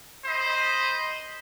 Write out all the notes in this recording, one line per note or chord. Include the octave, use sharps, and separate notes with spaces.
C5 D#5 B5